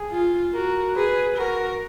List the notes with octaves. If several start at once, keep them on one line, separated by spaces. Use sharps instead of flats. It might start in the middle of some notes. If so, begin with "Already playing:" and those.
Already playing: G#4
F4
F#4 A#4
G#4 B4
F#4 A#4